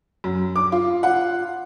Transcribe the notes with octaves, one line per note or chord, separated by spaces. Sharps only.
F#2
D6
F4
F4 F#5